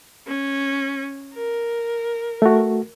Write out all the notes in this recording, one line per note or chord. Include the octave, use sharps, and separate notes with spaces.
C#4
A#4
A3 F#4